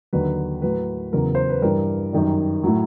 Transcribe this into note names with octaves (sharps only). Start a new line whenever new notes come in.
D#2 D3 F#3 B4
A2 F#3 B4
E2 C#3 F#3 A#4
C5
B4
G2 E3 G3 A#4
F#2 D#3 G3
A2 F#3